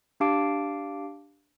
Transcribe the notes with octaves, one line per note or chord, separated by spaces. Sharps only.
D4 G4 F5 A5 D6 D7